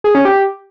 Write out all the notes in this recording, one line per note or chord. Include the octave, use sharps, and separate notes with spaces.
G#4
C#4
G4